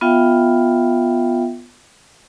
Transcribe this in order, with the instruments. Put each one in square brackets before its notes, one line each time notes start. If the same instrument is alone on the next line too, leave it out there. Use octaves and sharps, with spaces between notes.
[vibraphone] B3 F4 E5 F5 G5